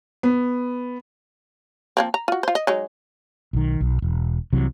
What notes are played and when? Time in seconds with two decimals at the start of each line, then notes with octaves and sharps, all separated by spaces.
0.23 B3
1.97 F3 A#3 C4
2.14 A#5
2.28 F4 F#4
2.43 F4 C5
2.55 D#5
2.67 F#3 G#3 D#4
3.53 B1 D#3
3.81 B1
4.02 E1
4.53 C2 C3 E3 F#3